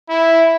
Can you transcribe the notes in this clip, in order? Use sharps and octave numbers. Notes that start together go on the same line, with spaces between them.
E4